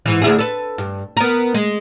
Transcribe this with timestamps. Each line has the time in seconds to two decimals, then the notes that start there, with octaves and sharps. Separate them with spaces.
0.06 G#2 E3
0.22 D2 E4 G#4
0.38 A4 B4
0.78 G2
1.17 B3 A#4
1.54 G#3